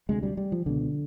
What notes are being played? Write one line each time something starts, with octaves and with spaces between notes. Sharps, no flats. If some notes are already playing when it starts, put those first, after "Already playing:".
D2 C3 G#3
G3
G3
F3
C#2 B2 D3